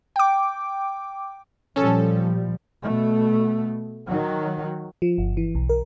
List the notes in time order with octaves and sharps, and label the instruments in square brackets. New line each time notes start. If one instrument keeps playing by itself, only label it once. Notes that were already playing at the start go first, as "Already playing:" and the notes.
[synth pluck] G5 D6
[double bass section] A#2 F3 G3 [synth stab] C#4 A4
[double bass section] B2 A3
D#3 F#3
[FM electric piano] F3
G1
E3
B1
A#4